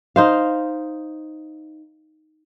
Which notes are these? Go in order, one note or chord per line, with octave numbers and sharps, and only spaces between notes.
D#4 C5 F5